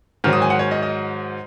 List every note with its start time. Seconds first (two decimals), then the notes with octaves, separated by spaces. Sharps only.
0.24 G#2 D#3 F#3 F6
0.33 D#6
0.42 G#5
0.50 F#5
0.59 C#5
0.71 D#5
0.83 D#5